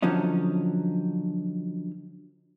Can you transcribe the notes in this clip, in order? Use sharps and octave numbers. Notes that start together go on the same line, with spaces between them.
D3 F3 F#3 C#4 D#4